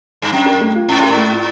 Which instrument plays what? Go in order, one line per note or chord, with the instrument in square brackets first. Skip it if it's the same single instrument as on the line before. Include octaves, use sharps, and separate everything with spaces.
[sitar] G2
[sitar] F#2 [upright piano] C#4
[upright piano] A#4
A3
F4
[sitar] G#2 [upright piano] C#4
[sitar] A2 [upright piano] A#4
[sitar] G#2
[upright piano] A3
F4